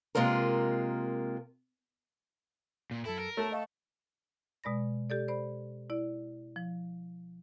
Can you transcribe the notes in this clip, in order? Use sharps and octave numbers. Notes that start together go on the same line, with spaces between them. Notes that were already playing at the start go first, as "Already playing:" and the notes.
C3 G#3 A#3 F4 A#4
A#2
F#2 F#3 E4 A4
A#4
A3 C#5 A5
A4 D#5 F5 C#6
B2 G#3 D5 B5 A#6
G4 A4 D5
C5 D5 B5
E4 D5
F3